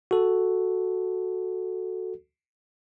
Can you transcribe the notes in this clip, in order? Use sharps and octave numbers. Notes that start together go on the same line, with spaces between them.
F#4 A4